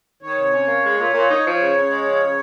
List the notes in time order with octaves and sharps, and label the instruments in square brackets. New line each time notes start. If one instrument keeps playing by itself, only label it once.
[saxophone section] D#3 [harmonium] C#5
[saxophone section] C3
C#4
A#3
G#3
A#2
A#2
D#4
F3
C#3
C#3
G#3
F3
C#3